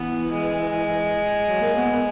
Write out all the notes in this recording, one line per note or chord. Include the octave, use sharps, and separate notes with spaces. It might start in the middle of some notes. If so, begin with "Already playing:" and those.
Already playing: E3 B3
G#3
F#3
A#3
B3
B3